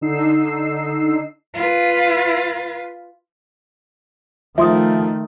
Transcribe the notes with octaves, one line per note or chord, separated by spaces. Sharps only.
D3 D#4 E6 C7
F4 B4
D#3 F3 A3 E5 C6 D#6